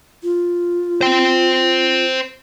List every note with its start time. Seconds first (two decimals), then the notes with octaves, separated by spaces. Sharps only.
0.23 F4
1.01 C5 G5